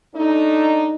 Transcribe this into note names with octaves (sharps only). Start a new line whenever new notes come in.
A3 D4 D#4